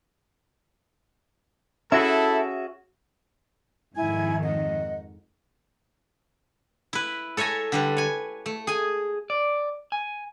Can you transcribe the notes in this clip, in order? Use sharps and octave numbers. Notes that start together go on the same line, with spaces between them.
C#4 E4 F#4 G#4 A4 E5
F2 G#2 D#3 E4 G#5 G#6
D#5 F#5
E4 B4
A4 C#5 E5 G#5 A#5
D3 G3 B4
C#5 G#5
A3
G#4 G#5
D5
G#5